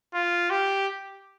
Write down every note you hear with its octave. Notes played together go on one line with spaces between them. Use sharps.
F4
G4